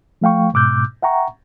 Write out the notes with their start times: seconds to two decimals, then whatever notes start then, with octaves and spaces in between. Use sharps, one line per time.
0.21 F3 A3 F5 G5 C#6
0.54 G#2 B2 D6 E6 F#6 G6
1.02 E5 F#5 G5 A#5 C#6